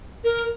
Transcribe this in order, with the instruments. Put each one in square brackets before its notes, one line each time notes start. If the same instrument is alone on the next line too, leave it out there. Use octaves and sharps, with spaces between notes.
[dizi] A#4